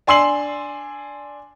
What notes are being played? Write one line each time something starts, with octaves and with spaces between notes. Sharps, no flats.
D4 G#5 C6 E6 C7 F#7